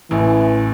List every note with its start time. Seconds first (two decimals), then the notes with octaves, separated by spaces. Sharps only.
0.10 A1 A2 E3